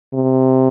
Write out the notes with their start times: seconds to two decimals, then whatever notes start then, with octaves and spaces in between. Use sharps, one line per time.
0.14 C3